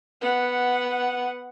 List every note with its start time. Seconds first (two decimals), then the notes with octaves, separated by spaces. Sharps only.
0.21 B3 F#5